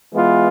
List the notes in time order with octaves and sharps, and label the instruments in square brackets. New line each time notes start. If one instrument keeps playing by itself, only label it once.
[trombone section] E3 G#3 B3 F4